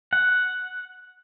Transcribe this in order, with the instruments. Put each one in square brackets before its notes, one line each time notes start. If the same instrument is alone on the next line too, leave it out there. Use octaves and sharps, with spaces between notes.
[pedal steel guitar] F#5